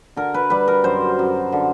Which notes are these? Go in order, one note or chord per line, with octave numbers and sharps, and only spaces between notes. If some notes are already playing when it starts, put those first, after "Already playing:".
D3 A#4
B4
G3 B4
A#4
F#2 C5
F#2
D3